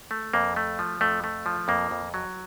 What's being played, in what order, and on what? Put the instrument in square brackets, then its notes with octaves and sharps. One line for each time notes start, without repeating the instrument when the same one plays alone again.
[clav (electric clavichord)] A3
F2 A#3
A3
F3
F2 A3
A3
F3
F2 A#3
F2
F#3